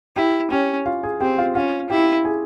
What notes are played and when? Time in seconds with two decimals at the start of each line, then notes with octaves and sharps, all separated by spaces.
0.16 E4 G4 G5
0.51 C#4 G4 G5
0.86 F4 F5
1.03 G#4 G#5
1.21 C4 G4 G5
1.38 F4 F5
1.55 C#4 F4 F5
1.90 E4 G4 G5
2.25 G#4 G#5